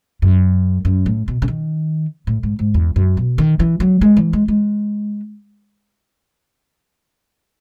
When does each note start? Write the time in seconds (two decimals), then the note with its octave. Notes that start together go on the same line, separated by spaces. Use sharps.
0.22 F#2
0.85 F#2
1.06 A2
1.28 B2
1.42 C#3
1.48 D#3
2.27 A2
2.43 G#2
2.59 G#2
2.74 E2
2.96 F#2
3.17 B2
3.38 D#3
3.60 E3
3.80 F#3
4.01 G#3
4.17 E3
4.33 G#3
4.48 G#3